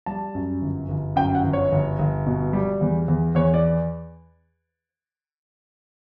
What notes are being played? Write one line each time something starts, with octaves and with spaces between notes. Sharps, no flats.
G3 A5
F#2
G1
G1
F#2 G5
F#5
G1
C#5
G1
G1
B2
G3
E2
E2
E2 C#5
D5